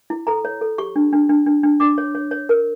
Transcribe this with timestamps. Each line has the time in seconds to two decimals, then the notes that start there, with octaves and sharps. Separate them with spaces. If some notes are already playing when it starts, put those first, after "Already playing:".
0.10 E4
0.27 A4 A#5
0.45 C#5
0.61 A4
0.78 G4 C#6
0.96 D4
1.13 D4
1.29 D4
1.46 D4
1.64 D4
1.80 D4 D6
1.98 C#5
2.15 C#5
2.31 C#5
2.49 A#4